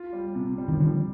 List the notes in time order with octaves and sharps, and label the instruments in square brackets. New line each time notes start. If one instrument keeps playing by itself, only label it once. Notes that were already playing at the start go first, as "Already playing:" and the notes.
Already playing: [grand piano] F4
G3
C3
G3
[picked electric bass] D#3
[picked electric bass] D3 F3 [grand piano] G3